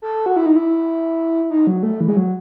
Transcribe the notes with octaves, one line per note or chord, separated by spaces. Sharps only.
A4
F#4
E4
D#4
E4
D#4
F#3
A3
E3
G#3
F#3